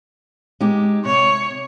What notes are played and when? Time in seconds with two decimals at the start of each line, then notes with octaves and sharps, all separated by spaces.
0.60 G#3 D#4 G4
1.05 C3 C#5